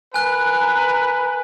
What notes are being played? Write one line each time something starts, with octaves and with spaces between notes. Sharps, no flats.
A#4 B4 G#5 F#6